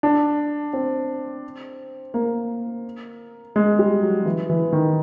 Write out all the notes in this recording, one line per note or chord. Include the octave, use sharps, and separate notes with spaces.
D4
C4
A#3
G#3
G3
F#3
E3
E3
D#3